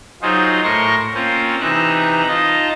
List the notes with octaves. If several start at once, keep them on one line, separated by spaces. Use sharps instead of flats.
F#3 D#4 F4 G#4 C5
A2 A#4 C6 C#6 A#6
A#3 C4 C#4 F4 C5
C3 E3 D#4 E5 A#5 F#6
D#4 F4 D#5 A5 A#5